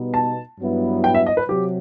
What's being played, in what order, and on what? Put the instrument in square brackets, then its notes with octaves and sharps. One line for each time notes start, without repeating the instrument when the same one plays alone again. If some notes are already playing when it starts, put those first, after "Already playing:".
Already playing: [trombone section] B2 G3 B3 D#4
[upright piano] A5
[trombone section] G2 F#3 B3 E4
[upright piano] G5
E5
D#5
B4
[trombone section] C3 F#3 [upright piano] G4